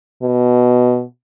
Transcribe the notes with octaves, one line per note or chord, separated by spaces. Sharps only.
B2